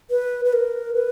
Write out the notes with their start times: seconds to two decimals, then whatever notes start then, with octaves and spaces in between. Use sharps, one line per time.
0.10 B4
0.45 B4
0.53 A#4
0.95 B4